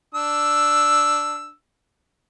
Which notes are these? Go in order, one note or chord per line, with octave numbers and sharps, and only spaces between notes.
D4 E6